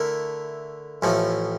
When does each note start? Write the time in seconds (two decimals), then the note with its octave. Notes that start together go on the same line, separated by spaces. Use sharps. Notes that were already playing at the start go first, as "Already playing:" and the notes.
Already playing: D3 A3 E4 A#4
1.02 A1 A2 F3 A3